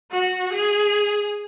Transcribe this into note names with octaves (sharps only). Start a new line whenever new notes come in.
F#4
G#4